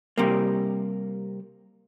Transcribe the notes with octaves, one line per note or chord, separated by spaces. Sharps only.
C3 G3 A#3